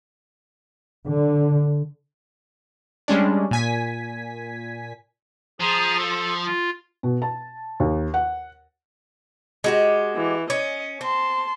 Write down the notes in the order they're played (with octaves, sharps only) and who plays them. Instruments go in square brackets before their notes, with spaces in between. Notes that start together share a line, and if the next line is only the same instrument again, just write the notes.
[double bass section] D3
[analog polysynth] G3 G#3 C#4 D4
A#2 G#5 B6
[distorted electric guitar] F3 [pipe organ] G#4 G#5 A#5
[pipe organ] A4
F4
[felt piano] B2
A5
D#2
F#5
[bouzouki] G#3 F#4 G4
[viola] E3
[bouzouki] C#4 [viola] D#5
[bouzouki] C4 [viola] A5 C6